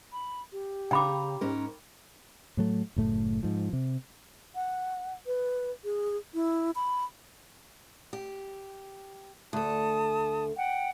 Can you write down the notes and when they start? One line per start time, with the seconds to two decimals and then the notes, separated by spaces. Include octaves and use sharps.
0.13 B5
0.52 G4
0.91 C#3 G5 A#5 B5 D6
1.41 G#2 C#4 A#4
2.57 A2 F#3 A3
2.96 F#1 A2 A3
3.43 G#2 F3
3.73 C3
4.55 F#5
5.26 B4
5.84 G#4
6.34 E4
6.75 B5
8.13 G4
9.53 D2 A4 A5 D#6
10.57 F#5 G5